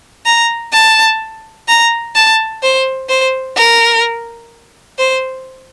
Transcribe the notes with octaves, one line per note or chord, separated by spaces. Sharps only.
A#5
A5
A#5
A5
C5
C5
A#4
C5